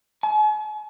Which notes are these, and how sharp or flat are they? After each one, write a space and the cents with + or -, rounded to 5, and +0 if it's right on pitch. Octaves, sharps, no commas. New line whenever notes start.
G#5 +45